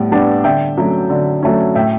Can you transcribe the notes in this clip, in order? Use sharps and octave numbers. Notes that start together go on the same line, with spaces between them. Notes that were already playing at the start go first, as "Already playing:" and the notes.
Already playing: A2 G3 B3
G3 B3 D4
D3 E5 G5
F#3 A3 C#4
D3
F#3 A3 C#4
A2 E5 G5